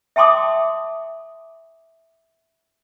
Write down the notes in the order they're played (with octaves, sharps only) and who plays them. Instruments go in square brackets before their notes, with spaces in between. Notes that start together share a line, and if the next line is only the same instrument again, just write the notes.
[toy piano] E5 G5 A5 C6 D6 D#6